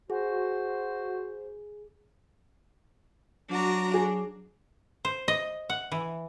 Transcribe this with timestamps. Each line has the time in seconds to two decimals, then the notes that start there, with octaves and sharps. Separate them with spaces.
0.10 F#4 G#4 C5
3.50 F#3 D4 F#4 A#5
3.94 G#4
5.05 C5
5.28 D#5
5.70 F#5
5.92 E3